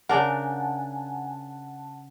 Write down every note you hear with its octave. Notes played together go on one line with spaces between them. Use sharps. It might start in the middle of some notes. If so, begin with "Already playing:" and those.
C#3 D4 A#4 F#5 G#5 A5